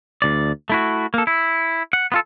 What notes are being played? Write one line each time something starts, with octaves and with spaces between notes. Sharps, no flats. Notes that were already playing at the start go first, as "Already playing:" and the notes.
D2 D5
A3 E4 F#4
A#3 A4
E4
F#5
B3 F4 A4